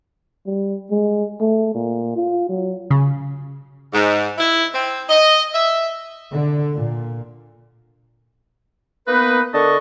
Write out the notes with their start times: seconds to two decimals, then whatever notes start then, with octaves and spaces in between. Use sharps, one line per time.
0.46 G3
0.91 G#3
1.40 A3
1.74 A#2
2.16 F4
2.49 F#3
2.91 C#3
3.93 G#2
4.38 E4
4.73 C4
5.09 D#5
5.54 E5
6.32 D3
6.74 A#2
9.07 A#3 B3 D#4 B4
9.53 D3 A#4 D#5 A5 C#6